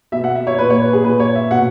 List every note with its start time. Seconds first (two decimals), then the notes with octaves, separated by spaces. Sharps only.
0.12 B2 E5
0.24 F#5
0.35 E5
0.47 C#5
0.59 A#2 B4
0.70 C#5
0.82 B4
0.93 G#4
1.04 A#2 B4
1.20 C#5
1.35 E5
1.51 B2 F#5